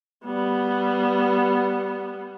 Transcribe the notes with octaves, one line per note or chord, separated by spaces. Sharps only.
G3 B3